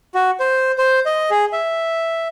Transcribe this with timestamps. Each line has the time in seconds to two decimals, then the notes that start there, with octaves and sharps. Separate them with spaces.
0.14 F#4
0.40 C5
0.78 C5
1.06 D#5
1.30 G#4
1.53 E5